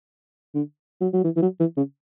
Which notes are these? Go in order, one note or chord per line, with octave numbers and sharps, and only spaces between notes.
D3
F#3
F#3
E3
E3
F#3
E3
C#3